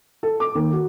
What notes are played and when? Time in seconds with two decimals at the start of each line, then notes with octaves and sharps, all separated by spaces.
0.23 A4
0.40 D6
0.55 D#2
0.73 F#4